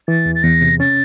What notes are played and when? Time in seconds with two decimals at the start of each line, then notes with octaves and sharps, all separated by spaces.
0.08 E3 A6
0.26 E2
0.35 A6
0.43 E2 A#6
0.61 C3
0.80 C#4 A6